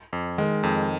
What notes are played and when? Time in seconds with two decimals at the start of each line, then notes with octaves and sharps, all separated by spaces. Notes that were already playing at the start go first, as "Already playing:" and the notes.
0.13 F2
0.38 D#3 G#3
0.63 F2